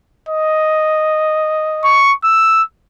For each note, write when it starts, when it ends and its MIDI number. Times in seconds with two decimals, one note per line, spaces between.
0.29 2.05 75
1.84 2.13 85
2.24 2.63 88